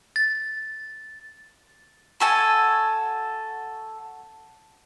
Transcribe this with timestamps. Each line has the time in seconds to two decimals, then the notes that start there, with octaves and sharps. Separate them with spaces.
0.16 A6
2.20 F#4 A4 G#5